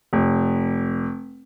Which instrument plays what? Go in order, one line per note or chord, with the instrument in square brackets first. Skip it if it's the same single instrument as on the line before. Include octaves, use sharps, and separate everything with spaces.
[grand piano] F1